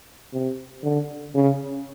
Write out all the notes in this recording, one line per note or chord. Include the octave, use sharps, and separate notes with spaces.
C3
D3
C#3